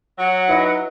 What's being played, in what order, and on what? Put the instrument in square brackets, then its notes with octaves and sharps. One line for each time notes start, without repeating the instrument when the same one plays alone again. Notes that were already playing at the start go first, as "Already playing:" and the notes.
[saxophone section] F#3 [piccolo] F#5
[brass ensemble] D#4 B4 [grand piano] E4 D#5